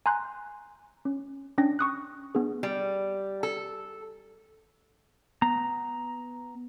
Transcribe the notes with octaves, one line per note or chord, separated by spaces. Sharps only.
G#5 A#5 C6 F#6 G6
C#4
C#4 D4 G5 A#6
C#6 D#6 F#6
B3 D4 G#4
G3
A4
B3 A#5